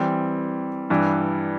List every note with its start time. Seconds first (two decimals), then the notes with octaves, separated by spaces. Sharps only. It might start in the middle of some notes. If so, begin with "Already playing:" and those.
Already playing: E3 G3 C4
0.90 G2 E3 G3